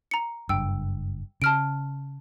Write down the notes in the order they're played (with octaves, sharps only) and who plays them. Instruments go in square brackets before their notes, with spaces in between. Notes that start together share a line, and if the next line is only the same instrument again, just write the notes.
[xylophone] A#5 C#7
[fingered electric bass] F#1 G2 [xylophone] G5 E6
[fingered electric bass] C#3 [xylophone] A5 F6 D7